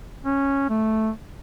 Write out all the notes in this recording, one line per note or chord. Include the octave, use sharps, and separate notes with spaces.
C#4
A3